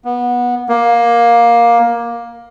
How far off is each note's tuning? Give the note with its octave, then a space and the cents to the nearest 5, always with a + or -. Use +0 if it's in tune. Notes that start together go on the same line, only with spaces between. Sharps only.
B3 -20
A#3 +15